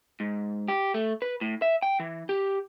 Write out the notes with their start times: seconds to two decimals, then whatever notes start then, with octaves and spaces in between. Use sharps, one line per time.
0.20 G#2
0.68 G4
0.94 A3
1.22 B4
1.41 A2
1.62 E5
1.82 G5
2.00 E3
2.29 G4